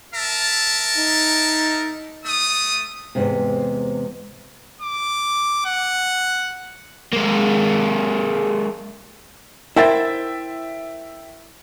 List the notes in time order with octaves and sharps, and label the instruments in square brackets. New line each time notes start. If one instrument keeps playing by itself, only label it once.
[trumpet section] A#4 E5 A5
[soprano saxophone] D#4
[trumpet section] A3 D#6
[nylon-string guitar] E2 G#2 C3
[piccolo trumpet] D6
F#5
[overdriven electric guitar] G#3 A#3
[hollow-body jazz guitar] E4 A#4 C5 [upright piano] E5 G5 A6